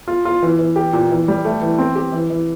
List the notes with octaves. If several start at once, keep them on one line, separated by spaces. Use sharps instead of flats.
F4
F4
E3
E3
G4
A#2
E3
G3
A3
E3
C4
G4
E3
E3